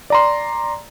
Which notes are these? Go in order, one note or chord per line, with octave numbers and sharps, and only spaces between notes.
D5 A#5 C6